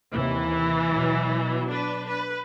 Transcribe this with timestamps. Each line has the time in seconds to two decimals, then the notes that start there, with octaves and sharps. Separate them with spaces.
0.13 D#2 C3 E3 A#3
0.90 B2 F#3
1.69 D4 B4
2.09 B4